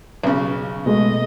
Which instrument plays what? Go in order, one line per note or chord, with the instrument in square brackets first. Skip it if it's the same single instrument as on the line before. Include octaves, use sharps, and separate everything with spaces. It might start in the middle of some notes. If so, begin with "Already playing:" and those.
[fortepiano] B1 C#3
[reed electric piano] B2 G#3 A3 [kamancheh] D#5